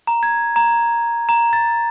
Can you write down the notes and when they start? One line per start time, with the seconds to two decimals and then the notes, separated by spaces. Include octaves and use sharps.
0.07 A#5
0.23 G#6
0.56 A#5
1.29 A#5
1.53 A6